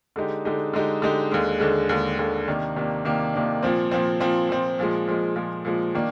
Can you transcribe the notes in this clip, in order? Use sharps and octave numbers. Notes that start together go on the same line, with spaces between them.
D3 G#3 D#4 G4
D3 G#3 D#4 G4
D3 G#3 D#4 G4
D3 G#3 D#4 G4
D#2 D3 G#3
D#2 D3 G#3
D#2 D3 G#3
D#2 D3 G#3
C3 D#3 A#3 D4
C3 D#3 A#3 D4
C3 D#3 A#3 D4
C3 D#3 A#3 D4
A#2 F3 C4
A#2 F3 C4
A#2 F3 C4
A#2 F3 C4
A#2 F3 G#3
A#2 F3 G#3
A#2 F3 G#3
A#2 F3 G#3
D#3 A#3 D4